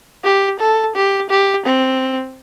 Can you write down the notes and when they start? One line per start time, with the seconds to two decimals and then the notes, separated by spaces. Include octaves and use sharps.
0.24 G4
0.59 A4
0.95 G4
1.30 G4
1.66 C4